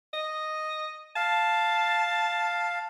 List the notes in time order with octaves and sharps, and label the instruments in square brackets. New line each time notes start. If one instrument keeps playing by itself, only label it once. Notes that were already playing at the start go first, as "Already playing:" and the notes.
[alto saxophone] D#5
[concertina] F5 [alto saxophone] A5